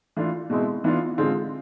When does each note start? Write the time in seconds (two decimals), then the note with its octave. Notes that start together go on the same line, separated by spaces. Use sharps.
0.16 E3 A3 D4 F4
0.50 B2 G#3 C4 E4
0.84 E3 B3 D4 F4
1.18 D3 G#3 C4 F4